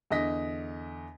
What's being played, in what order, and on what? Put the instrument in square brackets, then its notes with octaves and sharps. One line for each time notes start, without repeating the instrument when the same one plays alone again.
[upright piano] E2 D3 D#5 A#6 B6